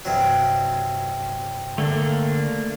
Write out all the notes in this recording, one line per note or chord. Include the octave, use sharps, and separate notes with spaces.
G2 C3 F#3
D3 A3 A#3 D4